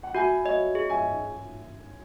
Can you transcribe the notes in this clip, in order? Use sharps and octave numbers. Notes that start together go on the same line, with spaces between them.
F#5
F#4 E5 G#5
C#5 D#5 E5
G#4
E5 G#5